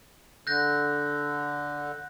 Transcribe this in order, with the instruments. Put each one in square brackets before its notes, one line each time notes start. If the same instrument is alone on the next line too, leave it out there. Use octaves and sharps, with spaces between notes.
[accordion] D3 [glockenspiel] F#6 G6 A#6